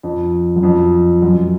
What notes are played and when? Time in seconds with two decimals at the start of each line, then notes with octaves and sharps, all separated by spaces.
0.03 F2
0.56 F#2
0.63 F2
1.22 F#2